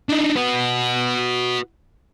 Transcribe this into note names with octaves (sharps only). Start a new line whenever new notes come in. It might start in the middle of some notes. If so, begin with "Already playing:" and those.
D4 D#4
F#4 B4